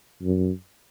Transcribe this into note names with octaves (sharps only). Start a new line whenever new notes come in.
F#2